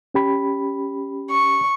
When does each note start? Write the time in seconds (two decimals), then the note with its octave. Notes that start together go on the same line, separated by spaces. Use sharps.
0.14 C#4 G4 B5
1.30 C#6